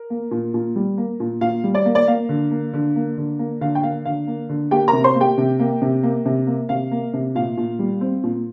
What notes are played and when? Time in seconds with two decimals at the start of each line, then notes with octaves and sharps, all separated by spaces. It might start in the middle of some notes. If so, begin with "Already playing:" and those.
Already playing: A#4
0.10 A#3
0.31 A#2
0.54 A#2
0.76 G3
0.98 A#3
1.20 A#2
1.41 A#2 F5
1.64 G3
1.75 D5
1.85 A#3
1.95 D5
2.08 A#3 F5
2.29 D3
2.51 A#3
2.74 D3
2.96 A#3
3.18 D3
3.39 A#3
3.61 D3 F5
3.75 G5
3.83 A#3 F5
4.05 D3 F5
4.27 A#3
4.49 D3
4.71 A#3 G4 G5
4.88 A#4 A#5
4.93 C3
5.04 C5 C6
5.15 A#3
5.20 G4 G5
5.38 C3
5.59 A#3
5.82 C3
6.03 A#3
6.26 C3
6.47 A#3
6.69 C3 F5
6.91 A#3
7.14 C3
7.35 A#2 F5
7.57 A#2
7.79 G3
8.01 C4
8.23 A#2